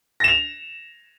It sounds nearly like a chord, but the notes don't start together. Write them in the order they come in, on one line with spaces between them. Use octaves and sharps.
A#6 E7 F7